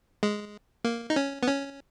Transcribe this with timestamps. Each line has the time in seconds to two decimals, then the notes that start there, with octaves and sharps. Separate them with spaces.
0.23 G#3
0.84 A#3
1.10 D#4
1.16 C#4
1.43 B3
1.48 C#4